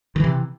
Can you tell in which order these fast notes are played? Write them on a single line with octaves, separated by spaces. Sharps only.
D#3 E3 C3